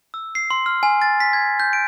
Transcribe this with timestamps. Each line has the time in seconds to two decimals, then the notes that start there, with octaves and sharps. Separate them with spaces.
0.14 E6
0.35 C7
0.50 C6
0.66 F6
0.83 G#5
1.02 A6
1.20 B6
1.33 G#6
1.60 G6
1.73 D7